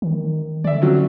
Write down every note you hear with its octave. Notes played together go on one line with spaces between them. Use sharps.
D#3
D3 D5 E5
F#3 C4 C#4